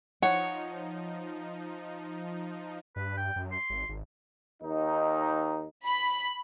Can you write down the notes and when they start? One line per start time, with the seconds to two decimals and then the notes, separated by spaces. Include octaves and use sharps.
0.22 F3 D#4 C#5 F#5
2.96 G2 B4
3.17 G5
3.36 F#2
3.52 C6
3.70 G#1
3.89 G#1
4.62 D#2 D#4
5.87 B5